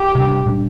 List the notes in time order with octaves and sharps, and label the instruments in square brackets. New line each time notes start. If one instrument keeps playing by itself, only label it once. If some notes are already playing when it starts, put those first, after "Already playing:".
Already playing: [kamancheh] G4
[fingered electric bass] C3 G3 D4
A#2 G3 D4